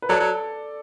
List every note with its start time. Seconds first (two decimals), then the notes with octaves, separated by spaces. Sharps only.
0.02 B4
0.09 F#3 A4 D5
0.20 F#3